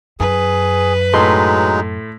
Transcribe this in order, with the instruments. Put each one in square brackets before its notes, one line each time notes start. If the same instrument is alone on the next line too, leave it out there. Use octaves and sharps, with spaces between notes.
[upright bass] F#2 [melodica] G#4 [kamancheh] B4
[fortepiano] A2 A3 C6 [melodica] F#3 G#3 D#4